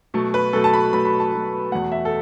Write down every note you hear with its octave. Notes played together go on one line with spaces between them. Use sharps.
B2 F#3 A3
B4
B2 F#3 A3 A4
A5
B5
B2 F#3 A3 B5
B5
A5
B2 F#3 A3
E2 B2 A3 F#5
E5
A4